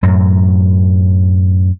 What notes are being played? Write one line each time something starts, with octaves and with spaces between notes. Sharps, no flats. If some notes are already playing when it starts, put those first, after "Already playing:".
F#2 A2 F#3